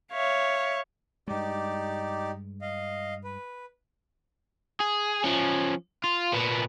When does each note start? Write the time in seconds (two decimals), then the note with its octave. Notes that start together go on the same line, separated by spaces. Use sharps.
0.12 C#5 E5 F5
1.28 G2 G#3 D#4 G4 D5
2.62 D#5 F5
3.24 B4
4.80 G#4
5.24 F3 C#4
6.04 F4
6.33 A#2 B3